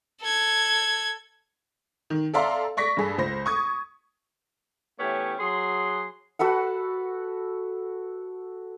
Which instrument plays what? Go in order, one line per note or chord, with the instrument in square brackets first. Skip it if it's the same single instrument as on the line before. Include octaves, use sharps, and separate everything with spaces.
[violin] A4 G#6
[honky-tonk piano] D#3
A4 D5 E5 F5 A#5 C6
D5 C#6 A#6 B6
G2 G#4 A4
C#2 C5 A#6
C#6 D#6 G#6
[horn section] E3 A3 B3 C#4 G4 C#5
F#3 G#4 C6
[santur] F#4 A4 B4 F#5